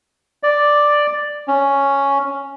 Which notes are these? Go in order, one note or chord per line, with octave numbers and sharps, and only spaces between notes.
D5
C#4